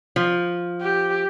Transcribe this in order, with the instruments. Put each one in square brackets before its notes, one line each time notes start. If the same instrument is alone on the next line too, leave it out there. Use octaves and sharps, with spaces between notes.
[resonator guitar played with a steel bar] F3
[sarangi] G4